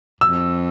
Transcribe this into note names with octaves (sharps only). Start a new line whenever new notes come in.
F2 E6